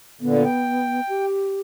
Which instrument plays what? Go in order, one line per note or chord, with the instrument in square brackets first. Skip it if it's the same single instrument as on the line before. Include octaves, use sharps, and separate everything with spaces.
[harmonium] A#2 D3 [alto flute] B3
[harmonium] G5
[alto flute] G4